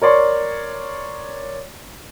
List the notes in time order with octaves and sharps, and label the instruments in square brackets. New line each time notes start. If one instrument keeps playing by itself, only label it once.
[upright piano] A#4 C#5 D5 C6 C#6